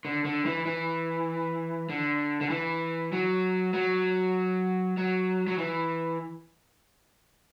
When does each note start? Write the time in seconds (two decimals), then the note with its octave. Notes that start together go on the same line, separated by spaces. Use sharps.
0.05 D3
0.25 D3
0.45 E3
0.66 E3
1.89 D3
2.41 D3
2.50 E3
3.12 F#3
3.74 F#3
4.97 F#3
5.47 F#3
5.58 E3